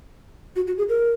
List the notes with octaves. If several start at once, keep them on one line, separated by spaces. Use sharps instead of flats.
F#4
F#4
G#4
A#4